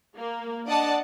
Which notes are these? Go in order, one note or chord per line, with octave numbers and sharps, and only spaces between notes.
A#3
D4 D5 D#5 F#5 A5